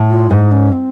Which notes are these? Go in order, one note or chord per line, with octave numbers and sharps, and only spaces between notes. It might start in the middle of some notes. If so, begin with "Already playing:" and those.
Already playing: A2
F4
G#2 D#4
C#4
C4